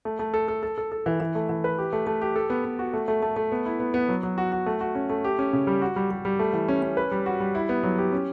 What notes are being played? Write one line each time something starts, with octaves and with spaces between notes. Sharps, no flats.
A3
A3
A4
A4
A4
A4
A4
E3
E3
A3
E3
B4
G4
A3
A3
G4
A4
B3
B3
F#4
A3
A3
A3
A3
B3
E4
B3
B3
F#3
F#3
F#4
F#4
A3
F#4
C#4
A3
G4
C#4
C#3
G3
F#4
G3
G3
G3
A3
E3
C#4
C#4
B4
G3
F#4
G3
E4
B3
F#3
G4
C#4